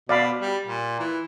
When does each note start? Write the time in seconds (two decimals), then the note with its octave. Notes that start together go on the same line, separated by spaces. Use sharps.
0.09 B2 D5 F5 B5
0.41 G3
0.67 A#2
0.99 E3